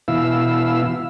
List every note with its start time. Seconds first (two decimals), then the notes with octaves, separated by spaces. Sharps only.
0.08 B2 E3 E4 F5 E6